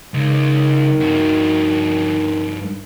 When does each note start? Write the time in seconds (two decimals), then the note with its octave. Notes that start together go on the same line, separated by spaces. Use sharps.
0.14 C#2 D#3
1.00 G2 F#4